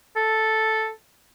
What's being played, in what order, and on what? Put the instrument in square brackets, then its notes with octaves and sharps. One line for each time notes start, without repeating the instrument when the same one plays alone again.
[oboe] A4